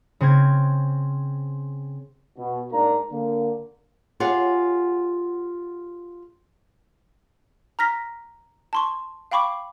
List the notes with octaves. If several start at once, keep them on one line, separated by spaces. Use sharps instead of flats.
C#3 C4 G#6
B2
G#2 A#3 D4 A#5
D3 A#3
F4 G4 G#4 C#5 F#5
A#5 F6 A#6 B6
A5 C6 C#6
F5 G5 B5 C#6 D6